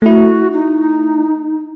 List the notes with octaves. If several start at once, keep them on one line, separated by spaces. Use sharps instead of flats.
A3 E4 F#4
D#4